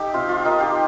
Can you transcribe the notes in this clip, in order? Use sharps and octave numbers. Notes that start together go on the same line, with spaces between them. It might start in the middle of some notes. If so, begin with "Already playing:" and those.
Already playing: D#4 G4 A4
C3 F4
F4
D#3 D#4
G4